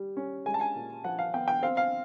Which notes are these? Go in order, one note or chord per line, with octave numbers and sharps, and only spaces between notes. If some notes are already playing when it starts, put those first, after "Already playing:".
Already playing: G3
C#4
G#3 G#5
A5
G#5
A#2
F3 F#5
F5
B3 G5
G5
C4 F5
F5